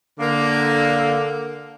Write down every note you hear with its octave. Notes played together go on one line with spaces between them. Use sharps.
D3 A#3